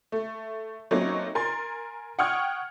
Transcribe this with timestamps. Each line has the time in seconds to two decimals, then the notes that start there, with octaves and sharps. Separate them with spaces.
0.12 A3
0.91 F#3 A3 A#3 C4 C#4 D#4
1.35 A#4 G#5 C6 A6
2.19 F#5 G5 C#6 D#6 F6 G#6